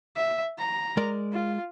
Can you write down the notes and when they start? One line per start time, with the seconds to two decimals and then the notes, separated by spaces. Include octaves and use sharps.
0.16 E5
0.58 A#5
0.97 G#3 A#4 D5
1.32 F4